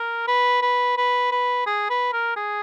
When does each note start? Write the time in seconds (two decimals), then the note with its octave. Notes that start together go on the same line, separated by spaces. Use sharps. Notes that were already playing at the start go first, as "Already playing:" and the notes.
Already playing: A#4
0.27 B4
0.62 B4
0.97 B4
1.32 B4
1.66 G#4
1.90 B4
2.13 A#4
2.36 G#4